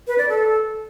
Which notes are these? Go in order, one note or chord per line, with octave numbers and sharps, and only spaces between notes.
B4
D5
A4